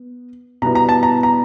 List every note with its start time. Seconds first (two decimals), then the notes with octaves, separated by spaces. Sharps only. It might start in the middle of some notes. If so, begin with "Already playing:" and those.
Already playing: B3
0.62 B2 G3 B3 E4 A#5
0.75 A#5
0.89 A5
1.03 A#5
1.23 A#5